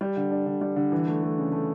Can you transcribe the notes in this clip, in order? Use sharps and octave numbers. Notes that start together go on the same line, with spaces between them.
G3
D3
D4
D3
G3
D3
E3
A3
A3
C#3
A3